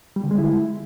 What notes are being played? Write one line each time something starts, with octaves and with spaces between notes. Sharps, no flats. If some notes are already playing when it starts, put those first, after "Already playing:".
G3
D3
G#3
E4